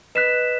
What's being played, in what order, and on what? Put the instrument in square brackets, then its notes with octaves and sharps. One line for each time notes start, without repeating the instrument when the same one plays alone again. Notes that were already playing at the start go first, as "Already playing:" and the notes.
[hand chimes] B4 D#5 [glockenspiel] F#6 B6 E7